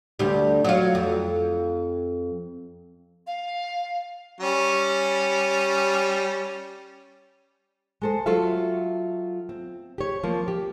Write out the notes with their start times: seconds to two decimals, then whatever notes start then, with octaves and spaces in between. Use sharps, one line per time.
0.19 D2 G3
0.64 F#3 F4
0.95 F2
3.27 F5
4.40 G3 C#4
8.02 G#3 A4 C5
8.26 F#3 F4 F#4 A4 E5 F5
9.49 C4
9.98 G4 C#5
10.23 F3 A#3 C4
10.48 G4